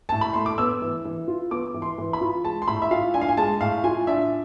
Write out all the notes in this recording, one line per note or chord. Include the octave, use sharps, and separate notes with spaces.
A2 A5
B5
A3 C6
D6
B3 E6
E3
E3
F4
B3 D6
E3
C6
E3
B5
F4
G#3 A5
C6
A2 B5
E5
F4 F5
D4 G#5
F5
G#5
G#3 A5
A2 F5
F4 G#5
D4 E5